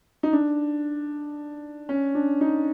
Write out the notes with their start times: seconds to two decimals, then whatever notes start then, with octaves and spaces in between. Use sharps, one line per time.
0.23 D#4
0.33 D4
1.89 C#4
2.15 D4
2.41 D#4